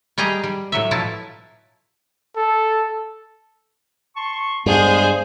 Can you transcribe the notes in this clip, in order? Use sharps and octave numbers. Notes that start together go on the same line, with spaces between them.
G3 G4 G#4 D#5 A#5
G3
A2 F#3 E5
B2 F3 F#3 E4 A5
A4
A5 C6 C#6
G2 D3 G#3 B3 G#4 C5